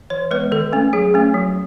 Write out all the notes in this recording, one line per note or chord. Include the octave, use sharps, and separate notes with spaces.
E3 C#5
G#3 B3 B4
D#3 A4
A3 C#4
F#3 G#4
A3 C#4
F#3